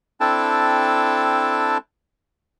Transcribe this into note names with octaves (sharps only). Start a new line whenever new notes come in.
C4 D4 E4 A4 G5 A5